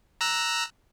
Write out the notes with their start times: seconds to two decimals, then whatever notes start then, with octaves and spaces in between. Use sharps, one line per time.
0.21 A#5 E6 F#6